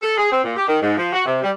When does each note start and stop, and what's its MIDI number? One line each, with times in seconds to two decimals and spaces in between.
0.03 0.16 69
0.17 0.32 68
0.32 0.40 60
0.44 0.55 46
0.56 0.65 67
0.68 0.77 51
0.82 0.96 44
0.98 1.10 53
1.13 1.23 66
1.26 1.39 48
1.43 1.50 55